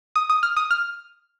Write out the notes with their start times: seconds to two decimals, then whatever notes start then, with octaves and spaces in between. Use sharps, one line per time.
0.15 D#6
0.30 D#6
0.43 F6
0.56 D#6
0.71 F6